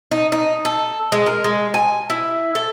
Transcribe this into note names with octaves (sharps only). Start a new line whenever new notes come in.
D#4
D#4
A4
G#3
A#4
G#3
G#5
E4
A4